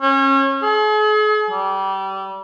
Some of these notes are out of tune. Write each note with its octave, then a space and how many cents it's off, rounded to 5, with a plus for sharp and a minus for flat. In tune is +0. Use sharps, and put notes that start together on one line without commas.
C#4 -30
G#4 +45
G3 -25